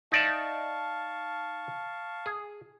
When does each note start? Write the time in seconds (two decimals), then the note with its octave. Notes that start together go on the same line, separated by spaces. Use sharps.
0.12 D#4 D5 E5 F5 A5 C#6
2.26 G#4